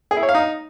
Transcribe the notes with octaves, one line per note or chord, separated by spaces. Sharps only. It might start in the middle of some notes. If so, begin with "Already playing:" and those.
G#4
E4
C#5
F5
D#4